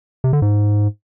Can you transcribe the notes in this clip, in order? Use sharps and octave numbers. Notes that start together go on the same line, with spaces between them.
C3
D3
G#2